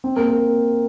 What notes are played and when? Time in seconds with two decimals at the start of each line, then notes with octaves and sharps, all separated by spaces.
0.04 C4
0.16 A#3
0.28 A#3